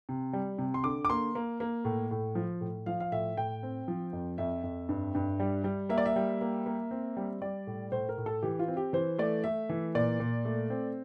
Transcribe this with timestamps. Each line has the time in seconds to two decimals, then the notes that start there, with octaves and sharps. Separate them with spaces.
0.09 C3
0.33 G3
0.58 C3
0.74 C6
0.84 D3 D6
1.05 D6
1.09 A#3 C6
1.35 A#3
1.60 A#3
1.85 A2
2.11 A2
2.35 F3
2.61 A2
2.86 F3 F5
3.00 F5
3.12 A2 E5
3.37 A2 G5
3.63 C4
3.88 F3
4.13 F2
4.38 F2 E5
4.63 F2
4.89 G2
5.15 G2
5.40 G3
5.64 G3
5.89 A#3 E5
5.98 D5
6.06 E5
6.16 G3
6.41 A#3
6.66 A#3
6.91 C4
7.17 G3
7.42 G3 D5
7.67 A2
7.92 A2 C5
8.09 A#4
8.18 A2
8.26 A4
8.43 E3 G4
8.59 F4
8.68 C4
8.77 G4
8.93 E3 C5
9.19 A3 D5
9.44 A3 E5
9.69 E3
9.95 A#2 D5
10.20 A#2
10.45 A3
10.70 C4